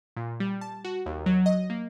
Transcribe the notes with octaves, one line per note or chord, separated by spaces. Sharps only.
A#2
G3
A5
F#4
D#2
F#3
D#5
A#3